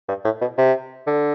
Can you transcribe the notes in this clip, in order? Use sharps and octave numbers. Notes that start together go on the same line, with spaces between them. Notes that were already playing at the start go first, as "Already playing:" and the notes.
G2
A2
B2
C3
D3